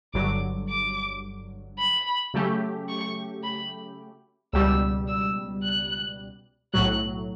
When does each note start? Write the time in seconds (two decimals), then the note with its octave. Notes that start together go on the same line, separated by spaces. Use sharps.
0.14 G1 G2 D3 F#3 D6
0.69 D6
1.79 B5
2.34 C#3 F#3 A3 C#4 G4
2.88 C#6
3.43 B5
4.53 C#2 B2 G3 E6
5.08 E6
5.63 F#6
6.73 B1 A2 F#3 F#6